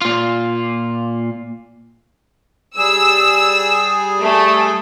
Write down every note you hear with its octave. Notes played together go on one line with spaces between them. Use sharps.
A#2 F4
G3 G#4 E6
A3